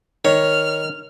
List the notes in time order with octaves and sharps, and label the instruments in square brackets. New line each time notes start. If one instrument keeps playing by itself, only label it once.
[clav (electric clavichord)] D#3 [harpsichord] C#5 [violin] F6